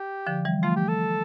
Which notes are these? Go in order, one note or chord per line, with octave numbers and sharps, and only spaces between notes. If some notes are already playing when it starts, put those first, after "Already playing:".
Already playing: G4
D3 F3
E3 G3
F3 A3 F4
G4
A4